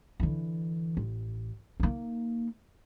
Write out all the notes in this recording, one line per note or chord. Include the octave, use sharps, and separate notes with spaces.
D3 E3
A1
A#3 D#4